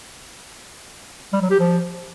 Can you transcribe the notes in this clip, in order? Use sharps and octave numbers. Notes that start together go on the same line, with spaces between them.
G3
F#3
G4
F3